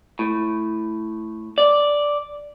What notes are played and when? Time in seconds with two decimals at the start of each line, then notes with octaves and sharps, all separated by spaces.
0.19 A2
1.58 D5